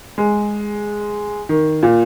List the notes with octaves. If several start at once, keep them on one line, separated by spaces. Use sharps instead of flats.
G#3
D#3
A#2